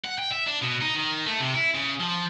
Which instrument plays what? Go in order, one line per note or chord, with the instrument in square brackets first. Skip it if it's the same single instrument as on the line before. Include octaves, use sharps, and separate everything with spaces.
[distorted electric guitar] F#5
G5
E5
D4
B2
D#4
D#3
A3
C3
E4
C#3
F3